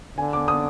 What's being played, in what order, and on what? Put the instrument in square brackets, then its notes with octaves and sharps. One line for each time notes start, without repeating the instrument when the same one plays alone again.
[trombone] D3 [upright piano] G#5
[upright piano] D6
D#6